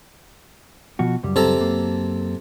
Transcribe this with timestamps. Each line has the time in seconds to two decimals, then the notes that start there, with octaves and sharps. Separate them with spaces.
0.99 B2 F3 F#4
1.23 C#2 F#2 G3
1.36 C3 A4 A#5
1.59 F#2 A#3